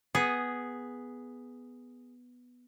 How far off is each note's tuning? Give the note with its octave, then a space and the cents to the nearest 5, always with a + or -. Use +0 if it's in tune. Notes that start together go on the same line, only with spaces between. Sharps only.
B3 +0 G#4 +0